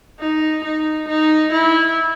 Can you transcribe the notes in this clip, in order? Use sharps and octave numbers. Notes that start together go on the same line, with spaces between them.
D#4
D#4
D#4
E4